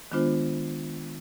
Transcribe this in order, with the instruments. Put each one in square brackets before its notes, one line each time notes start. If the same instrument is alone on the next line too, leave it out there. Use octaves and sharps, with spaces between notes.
[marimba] D#3 G#3 B3 D4 F4 C5